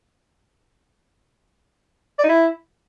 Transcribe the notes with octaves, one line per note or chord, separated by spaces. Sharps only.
D5
D#4
E4